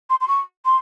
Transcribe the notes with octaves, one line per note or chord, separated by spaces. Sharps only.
C6
C6
C#6
C6